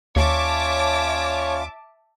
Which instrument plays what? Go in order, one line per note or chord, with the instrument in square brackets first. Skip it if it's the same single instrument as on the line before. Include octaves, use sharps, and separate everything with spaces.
[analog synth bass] D#2 [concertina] C#4 F4 D5 [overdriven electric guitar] C#5 [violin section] E5 A5 D6